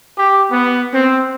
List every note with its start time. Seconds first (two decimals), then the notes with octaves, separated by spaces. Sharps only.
0.17 G4
0.51 B3
0.93 C4